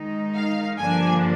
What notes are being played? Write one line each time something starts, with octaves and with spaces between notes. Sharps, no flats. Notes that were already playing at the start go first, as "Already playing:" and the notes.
Already playing: D#3 G#3 D#4
F5
G2 D3 F3 A#3 D4 G#5